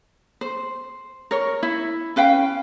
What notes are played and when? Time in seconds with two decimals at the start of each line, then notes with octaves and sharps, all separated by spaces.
0.41 C5
1.31 A#4 C#5
1.63 E4
2.16 C#4 B4 F5 G5